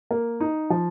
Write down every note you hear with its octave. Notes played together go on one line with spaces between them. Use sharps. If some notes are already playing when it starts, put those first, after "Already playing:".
A#3
D#4
F3